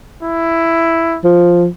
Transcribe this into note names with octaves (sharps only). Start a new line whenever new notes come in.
E4
F3